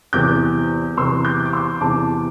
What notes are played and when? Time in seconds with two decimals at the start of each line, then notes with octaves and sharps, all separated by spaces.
0.13 E2 C3 E3 D6 G6
0.97 E2 C3 E3 C6 E6
1.25 D6 G6
1.46 D6
1.53 C6 E6
1.81 E2 C3 E3 A5 D6